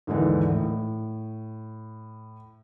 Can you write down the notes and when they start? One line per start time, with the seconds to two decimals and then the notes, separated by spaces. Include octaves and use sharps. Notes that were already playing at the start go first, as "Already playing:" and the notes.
0.07 D#2 G#2 D3 E3
0.50 A2